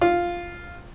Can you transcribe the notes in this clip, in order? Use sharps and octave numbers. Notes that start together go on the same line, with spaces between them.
F4